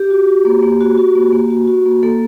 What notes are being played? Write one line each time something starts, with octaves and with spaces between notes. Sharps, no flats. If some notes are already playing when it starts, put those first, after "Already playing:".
Already playing: G4
F#4
F#4
A#3
A#3
F#4
F#4
A#3
A#3
F#4
F#4
A#3
A#3 A4